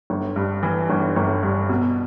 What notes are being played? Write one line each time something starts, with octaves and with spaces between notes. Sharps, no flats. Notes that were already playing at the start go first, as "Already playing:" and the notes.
G1
G2
E3
G1
G1
G2
B2